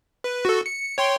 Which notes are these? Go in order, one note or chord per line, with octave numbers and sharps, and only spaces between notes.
B4
F#4 A4
C#7
C#5 G5 C6